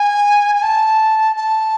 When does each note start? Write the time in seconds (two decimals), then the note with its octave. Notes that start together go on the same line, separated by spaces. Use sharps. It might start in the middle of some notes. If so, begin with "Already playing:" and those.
Already playing: G#5
0.55 G#5
0.63 A5
1.36 A5